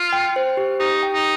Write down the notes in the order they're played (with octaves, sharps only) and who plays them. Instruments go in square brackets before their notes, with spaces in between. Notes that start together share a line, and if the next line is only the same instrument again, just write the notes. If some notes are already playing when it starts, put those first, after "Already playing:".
Already playing: [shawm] F4
[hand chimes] G5
C5
G4
[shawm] D#4 [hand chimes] G4
[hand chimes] G5
[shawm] D#4